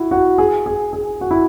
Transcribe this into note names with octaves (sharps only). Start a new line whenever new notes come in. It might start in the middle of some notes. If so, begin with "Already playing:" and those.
Already playing: E4 F#4
F#4
G#4
G#4
G#4
F#4
E4